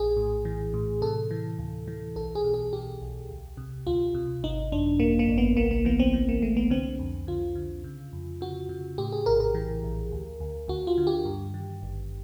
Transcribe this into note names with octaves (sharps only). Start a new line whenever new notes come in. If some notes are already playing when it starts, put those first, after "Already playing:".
Already playing: A#1 G#4
A2
E3
A2
C3 A4
E3
D2
E3
B1 A4
G#4
B2
G#4
B2 G4
B1
D2
C3
D2 F4
C3
G#1 D#4
F#2 D4
G#1 A#3
A#3
G#1
B3
C2 A#3
A#3
E3 B3
C4
E3
A#3
C2 A3
B3
D3 C4
F2
D3 F4
D3
C#3
F2
C#3 F#4
C#3
A2 G4
G#4
A#1 A#4
A#4
E3
A#1
D2
D2
D2 F#4
F4
D3
G4
G2
D#3
G#1